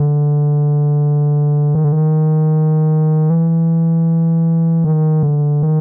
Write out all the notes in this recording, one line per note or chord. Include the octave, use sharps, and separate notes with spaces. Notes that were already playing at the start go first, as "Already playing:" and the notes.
Already playing: D3
D#3
D3
D#3
E3
D#3
D3
D#3